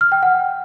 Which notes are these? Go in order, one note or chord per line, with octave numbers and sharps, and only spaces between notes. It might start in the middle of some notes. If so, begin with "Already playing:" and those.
F6
G5
F#5